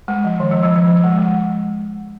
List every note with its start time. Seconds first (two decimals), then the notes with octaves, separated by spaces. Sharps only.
0.08 G#3
0.24 F3
0.40 D#3
0.51 F3
0.63 F3
0.76 F3
0.88 F3
1.04 G#3
1.19 G#3